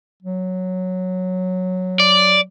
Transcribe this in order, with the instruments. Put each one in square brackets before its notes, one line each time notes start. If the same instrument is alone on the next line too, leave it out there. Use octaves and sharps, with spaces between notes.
[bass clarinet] F#3
[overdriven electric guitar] D5